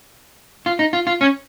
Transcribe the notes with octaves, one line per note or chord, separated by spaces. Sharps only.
F4
D#4
F4
F4
C#4